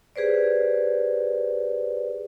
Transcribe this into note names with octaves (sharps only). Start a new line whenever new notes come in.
G4 G#4 B4 C5 D5